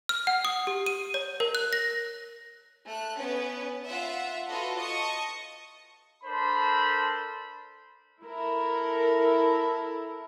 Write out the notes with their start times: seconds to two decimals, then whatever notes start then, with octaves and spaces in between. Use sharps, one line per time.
0.09 F6
0.27 F#5
0.45 D#6
0.67 G4
0.86 D#7
1.14 C#5
1.40 A#4
1.55 F#6
1.73 A#6
2.84 A3 F#6
3.16 B3 C#4 B4
3.88 F4 E5 F#5
4.50 F4 F#4 A4 B4 D#5
4.80 D#5 A5 C#6 D#6
6.24 D4 A4 A#4 C5 B5 C6
8.23 E4 A4 A#4